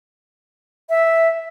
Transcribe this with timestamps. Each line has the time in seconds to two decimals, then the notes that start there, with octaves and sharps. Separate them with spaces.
0.89 E5